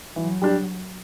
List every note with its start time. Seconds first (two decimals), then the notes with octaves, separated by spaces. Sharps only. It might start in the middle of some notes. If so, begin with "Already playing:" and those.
0.16 E3 F#3
0.42 G3 D4 G4